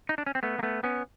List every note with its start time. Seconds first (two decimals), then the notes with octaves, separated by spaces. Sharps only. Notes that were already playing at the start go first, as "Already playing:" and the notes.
0.09 D#4
0.18 D4
0.26 C#4
0.35 C4
0.43 A3 B3
0.59 A#3
0.63 A3 B3
0.84 B3 C#4